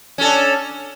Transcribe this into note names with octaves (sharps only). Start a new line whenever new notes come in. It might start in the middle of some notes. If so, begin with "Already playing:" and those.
C#4 D4 A4